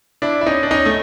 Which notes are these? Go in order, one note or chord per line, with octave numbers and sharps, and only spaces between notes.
D4 E4
E4
C#4 D#4
D4
C#4 D#4
A3